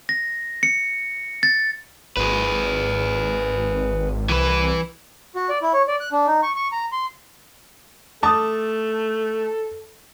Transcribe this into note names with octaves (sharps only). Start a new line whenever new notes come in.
A#6
C#7
A6
G#1 G#4 B4
C2 E3 B4
F#4
D5
E4
C#5
D5
F#6
D4
D#4
C#6
C#6
A#5
C6
A3 A4 A5 D6 D#6